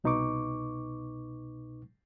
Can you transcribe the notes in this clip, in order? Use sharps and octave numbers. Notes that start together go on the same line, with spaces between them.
C2 B2 D#4 B4 C#6 D6